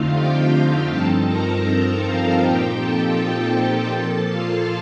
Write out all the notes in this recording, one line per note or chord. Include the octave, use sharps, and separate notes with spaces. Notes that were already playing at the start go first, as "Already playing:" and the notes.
Already playing: F2 D3 A3 C4 D#4 F4 F5
G4 G5
G2 F3 C4 D#4 A4 A5
A#4 A#5
A4 A5
F4 F5
A#2 F3 C4 D#4 G4 G5
A4 A5
G4 G5
G4 G5
A#2 F3 A#3 A4 A5
F4 F5